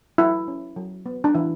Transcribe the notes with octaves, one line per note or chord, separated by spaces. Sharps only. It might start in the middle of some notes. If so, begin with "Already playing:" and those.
F#3 E4
C#4
F#3
B3
D4
E3 E4